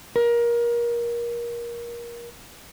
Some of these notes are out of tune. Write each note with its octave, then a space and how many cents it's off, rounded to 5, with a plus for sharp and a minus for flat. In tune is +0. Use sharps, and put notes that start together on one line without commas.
A#4 +25